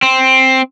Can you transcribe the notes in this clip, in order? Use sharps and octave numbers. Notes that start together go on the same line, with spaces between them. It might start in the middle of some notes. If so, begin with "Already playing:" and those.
C4